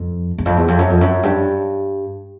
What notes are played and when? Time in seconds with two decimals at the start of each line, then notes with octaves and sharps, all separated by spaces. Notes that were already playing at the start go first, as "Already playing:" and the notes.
Already playing: F2
0.38 E2
0.46 F2
0.57 E2
0.68 F2
0.79 F#2
0.90 F2
1.01 F#2
1.23 G2